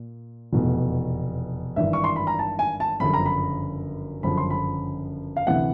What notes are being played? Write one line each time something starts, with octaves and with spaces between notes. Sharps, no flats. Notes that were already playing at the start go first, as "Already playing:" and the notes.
Already playing: A#2
F1 E2 B2
G#1 G2 E3 E5
C#6
C6
B5
A#5
A5
G#5
A5
G1 F#2 C#3 F3 B5
A#5
B5
G1 F#2 C#3 F3 B5
C6
B5
F5
D2 C3 E3 F#5